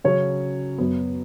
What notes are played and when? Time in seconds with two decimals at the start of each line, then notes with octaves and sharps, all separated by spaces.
0.04 C#3 F#3 C#4 C#5
0.78 F#2 F#3 B3